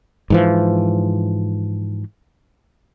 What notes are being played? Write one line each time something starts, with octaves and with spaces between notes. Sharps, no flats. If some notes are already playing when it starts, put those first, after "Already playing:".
G#2 E3 F3